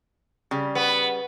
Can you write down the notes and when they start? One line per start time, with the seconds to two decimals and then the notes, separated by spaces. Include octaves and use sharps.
0.51 C#3 G3
0.75 B3